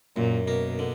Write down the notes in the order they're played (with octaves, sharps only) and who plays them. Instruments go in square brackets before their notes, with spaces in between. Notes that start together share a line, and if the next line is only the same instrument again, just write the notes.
[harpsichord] F#2 [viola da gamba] A#2
[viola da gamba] B2 [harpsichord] A#3
[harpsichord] D3